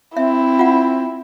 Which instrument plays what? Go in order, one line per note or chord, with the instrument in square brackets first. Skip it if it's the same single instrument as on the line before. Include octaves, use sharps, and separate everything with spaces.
[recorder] C4 [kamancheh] E4 [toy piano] E5
[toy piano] F4 F#5